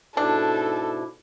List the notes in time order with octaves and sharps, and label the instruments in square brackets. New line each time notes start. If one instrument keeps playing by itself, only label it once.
[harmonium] G#2 B2 E4 [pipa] D4 [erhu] A4